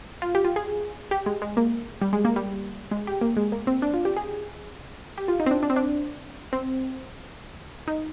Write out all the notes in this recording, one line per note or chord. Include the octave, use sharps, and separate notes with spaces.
F4
G4
F4
G#4
G4
G#3
G#3
A#3
G3
G#3
A#3
G3
G#3
G4
A#3
G#3
A#3
C4
D4
F4
G4
G#4
G4
F4
D#4
C4
D4
D4
C4
D4
C4
D#4